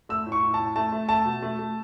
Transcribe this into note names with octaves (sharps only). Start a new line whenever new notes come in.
A3 E6
A2
C#6
A2
A5
A2
A3 A5
A3
A3 A5
B2
A3
A3